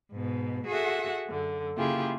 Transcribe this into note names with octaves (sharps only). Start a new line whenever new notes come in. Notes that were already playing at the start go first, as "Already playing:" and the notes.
G#2 B2
F#4 G#4 A4 E5 F#5
F#2 D3
C#3 A#3 E4 F4 G4 G#4